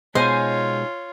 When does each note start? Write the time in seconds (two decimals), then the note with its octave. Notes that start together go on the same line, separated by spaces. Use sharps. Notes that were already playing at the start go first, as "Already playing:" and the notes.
0.15 B2 G#3 D#4 F4 C5 C#5 G#5 C6